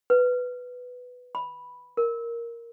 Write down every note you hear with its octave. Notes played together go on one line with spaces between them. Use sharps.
B4
B5
A#4